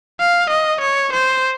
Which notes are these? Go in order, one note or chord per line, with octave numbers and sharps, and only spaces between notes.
F5
D#5
C#5
C5